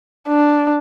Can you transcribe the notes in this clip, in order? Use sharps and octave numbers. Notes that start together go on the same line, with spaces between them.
D4